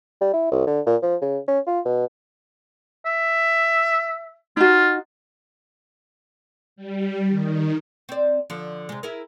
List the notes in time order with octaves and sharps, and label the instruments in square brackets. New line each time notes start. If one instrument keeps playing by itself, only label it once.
[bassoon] G3
E4
C2
D3
A#2
F3
C#3
C#4
F4
B2
[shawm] E5
[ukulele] D#4 F#4 [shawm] F4
[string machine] G3
D#3
[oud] C4 D5
D3 F3
C3 G#3
E4 G#4 A#4